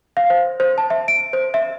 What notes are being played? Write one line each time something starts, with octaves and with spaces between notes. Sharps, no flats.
F5
C5
C5
A5
E5
D7
C5
E5